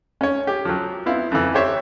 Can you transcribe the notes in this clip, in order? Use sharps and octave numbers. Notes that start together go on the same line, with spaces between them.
C#4 C#5
G4
F3 F#3
B3 C4 E4 F5
F2 E3
G4 C5 C#5 E5